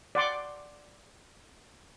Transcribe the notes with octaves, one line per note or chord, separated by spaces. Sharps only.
D5 F#5 C6 D6